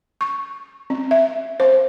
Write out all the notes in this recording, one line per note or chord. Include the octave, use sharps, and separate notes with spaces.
C#6
C4
E5
C5